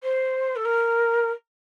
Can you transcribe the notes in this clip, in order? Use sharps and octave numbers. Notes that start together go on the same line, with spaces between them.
C5
A4
A#4